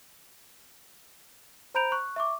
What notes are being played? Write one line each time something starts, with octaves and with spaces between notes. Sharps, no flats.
C5 A#5 B5 G6 D7 F7
C#6 F#6
E5 C#6 D6